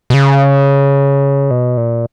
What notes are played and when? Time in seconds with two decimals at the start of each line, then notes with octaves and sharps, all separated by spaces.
0.10 B2
0.14 C#3
1.51 B2
1.77 A#2